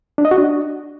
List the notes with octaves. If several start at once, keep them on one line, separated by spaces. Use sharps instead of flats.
D4
D#5
F#4
D4